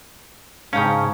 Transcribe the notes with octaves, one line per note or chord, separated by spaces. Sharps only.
G#2 C#3 C#4 F5 G5 A5 A#5